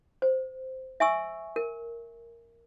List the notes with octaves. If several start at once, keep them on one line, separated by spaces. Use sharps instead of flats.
C5
E5 G#5 C#6 E6
A#4